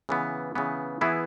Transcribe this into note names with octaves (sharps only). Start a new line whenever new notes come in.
C#3 E3 B3
C#3 E3 B3
E3 B3 E4 G#4